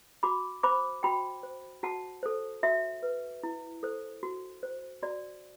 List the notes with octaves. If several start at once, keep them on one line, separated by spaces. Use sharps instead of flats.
F#4 B5 D6
C5 B5 D6
F#4 G5 B5
C5
F#4 F#5 A5
A4 C5
F#4 E5
B4
E4
A4 C5
F#4
C5
F#4 D5